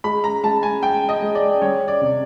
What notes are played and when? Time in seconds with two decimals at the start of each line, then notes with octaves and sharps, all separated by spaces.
0.04 G#3 B5
0.24 A#5
0.43 G#3 A5
0.63 G#5
0.83 G#3 G5
1.09 D#5
1.22 G#3
1.35 D5
1.62 G3 C#5
1.88 D5
2.01 C3